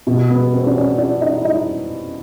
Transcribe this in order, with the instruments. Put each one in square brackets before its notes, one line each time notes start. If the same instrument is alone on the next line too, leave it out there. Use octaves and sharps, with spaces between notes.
[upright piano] B2
B3
C4
D4
C#4
D4
D#4
E4
D#4